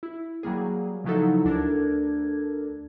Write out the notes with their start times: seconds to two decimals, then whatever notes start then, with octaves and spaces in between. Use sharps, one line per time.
0.03 E4
0.43 F#3 G3 A#3 G#4
1.04 C#3 F3 F#3 D#4 E4 A4
1.45 D2 D4 A4 A#4 G#6